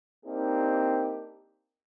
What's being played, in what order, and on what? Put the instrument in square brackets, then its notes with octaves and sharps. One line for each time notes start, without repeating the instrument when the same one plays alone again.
[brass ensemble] A#3 C4 D4 D#4 G4